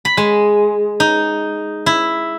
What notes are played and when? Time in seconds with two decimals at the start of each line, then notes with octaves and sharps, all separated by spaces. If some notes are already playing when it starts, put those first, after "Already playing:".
0.05 B5
0.17 G#3
1.00 D#4
1.86 E4